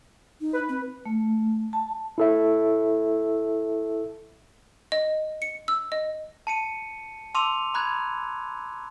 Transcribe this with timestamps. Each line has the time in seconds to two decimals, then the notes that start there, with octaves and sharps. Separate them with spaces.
0.41 D#4
0.53 B4
0.69 C4
1.05 A3
1.73 A5
2.18 E4 A4 E5
4.92 D#5
5.42 C#7
5.68 E6
5.92 D#5
6.47 A5 C#7 D#7
7.34 A5 C6 D6 E6 D#7 F7
7.74 A#5 B5 F#6 G#6